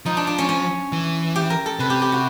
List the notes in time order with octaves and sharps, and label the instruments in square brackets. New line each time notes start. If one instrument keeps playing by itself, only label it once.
[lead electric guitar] F3 [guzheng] D#4
[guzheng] D4
D4
C#4
C#4
[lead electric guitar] E3
[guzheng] G4
A#4
A4
[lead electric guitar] C3 [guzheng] B4
[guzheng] G4
G4
F#4